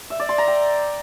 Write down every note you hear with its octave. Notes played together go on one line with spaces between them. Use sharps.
E5
D5
C6
A#5
G5